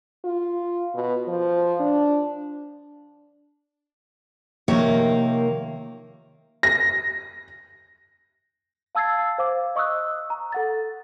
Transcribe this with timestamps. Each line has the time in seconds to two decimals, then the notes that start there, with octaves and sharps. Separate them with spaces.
0.25 F4
0.94 B2
1.28 F3
1.80 D4
4.68 C3 D#3 F3 A#3 C#5 E5
6.63 A#6
8.95 F5 A5 E6 G#6 A6 C7
9.38 C5 F5 D6
9.76 D#5 C#6 D#6 E6 F#6
10.30 A#5
10.52 A4 F#5 A6